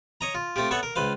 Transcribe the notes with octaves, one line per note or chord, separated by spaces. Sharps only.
C#5 D#5 A#5
F4
A3 C4 F4 G4
B3 A4 C#5 E5 F#5
A#4
C#2 B4 C5 F5